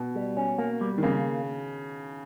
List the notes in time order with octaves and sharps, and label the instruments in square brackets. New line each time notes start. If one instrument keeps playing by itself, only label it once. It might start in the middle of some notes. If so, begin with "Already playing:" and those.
Already playing: [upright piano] B2
[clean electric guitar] G3
C#4
A#3
G3
[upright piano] D#3
[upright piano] C#3 [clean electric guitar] A#3